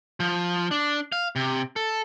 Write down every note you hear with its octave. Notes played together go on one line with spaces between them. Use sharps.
F3
D4
F5
C3
A4